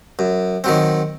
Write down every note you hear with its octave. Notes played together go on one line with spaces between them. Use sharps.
F#2
D#3 F#3 C4